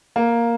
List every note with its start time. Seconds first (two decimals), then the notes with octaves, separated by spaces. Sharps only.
0.16 A#3